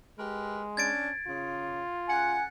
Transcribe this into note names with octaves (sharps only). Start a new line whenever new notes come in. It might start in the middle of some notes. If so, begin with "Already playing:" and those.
G#3 G4 A#4 B4
C#4 D4 G#6 A6 D7
C#3 F4
C#3 F#5 G#5